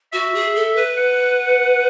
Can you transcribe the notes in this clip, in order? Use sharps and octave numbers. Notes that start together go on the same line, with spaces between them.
F#4 E5
G#4
A4
B4
F#5